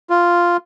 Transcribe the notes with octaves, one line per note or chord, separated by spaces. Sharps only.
F4